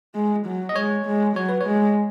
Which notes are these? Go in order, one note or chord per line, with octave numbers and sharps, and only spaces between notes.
G#3
F#3
D#5
G#3 C#5
G#3
F#3 C#5
B4
C#5
G#3